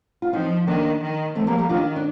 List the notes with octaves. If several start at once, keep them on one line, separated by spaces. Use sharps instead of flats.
F4
F3 C4 D#4
D#3 A#3 D4
D#3
F3 A3 C4
G3 A#3
G3 A#3
D#3 D4 F4
D4